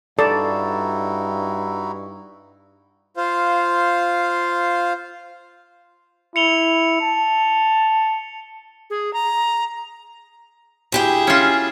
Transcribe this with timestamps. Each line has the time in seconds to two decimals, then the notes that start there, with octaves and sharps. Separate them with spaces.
0.19 G2 D#4 E4 F#4 A4 D5 A5
3.17 F4 C5 F5
6.36 E4 C#7 F7 G7
7.01 A5
8.90 G#4
9.14 A#5
10.92 D2 E4 G4 G#4 G5
11.27 C#4 F4